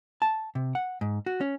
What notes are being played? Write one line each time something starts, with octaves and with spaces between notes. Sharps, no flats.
A5
C3
F#5
G#2
F#4
C#4